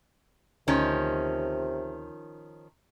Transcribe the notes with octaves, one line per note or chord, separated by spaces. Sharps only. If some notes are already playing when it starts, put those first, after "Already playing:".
D2 C3 D#3 F3 C#4